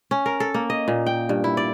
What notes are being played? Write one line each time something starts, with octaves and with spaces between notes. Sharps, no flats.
C#4
A#4
A4
A#3
D#5
A#2
G5
G2
E4
D5